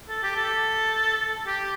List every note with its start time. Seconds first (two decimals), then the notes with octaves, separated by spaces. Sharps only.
0.09 A4
0.23 G4
0.36 A4
1.47 G4